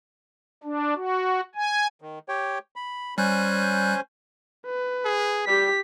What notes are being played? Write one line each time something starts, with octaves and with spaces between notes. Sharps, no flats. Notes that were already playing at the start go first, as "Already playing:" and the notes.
D4
F#4
G#5
D#3
G4 C#5 G5
B5
G3 C#4 C5 G#5 F#6 G6
B4
G#4
G3 G4 B6